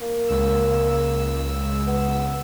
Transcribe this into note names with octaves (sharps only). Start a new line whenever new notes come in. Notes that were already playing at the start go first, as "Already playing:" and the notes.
A#3
C#2 E6
B3